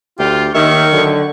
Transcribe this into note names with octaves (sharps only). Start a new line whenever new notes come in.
D2 F4 G4
D#2 D#3 E5 C#6
D3 F#3